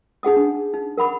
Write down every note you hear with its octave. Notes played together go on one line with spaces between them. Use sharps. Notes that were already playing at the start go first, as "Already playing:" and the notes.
D#4 G#4 F#5 D#6
D4
D#4
A#4 F#5 B5 D6